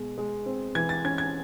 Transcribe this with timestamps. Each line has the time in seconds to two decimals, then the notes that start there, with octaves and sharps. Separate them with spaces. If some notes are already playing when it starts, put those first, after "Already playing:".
Already playing: B2 G#3
0.18 G#3
0.46 C4
0.75 E3 G#6
0.89 A6
1.05 C#4 G#6
1.18 G#6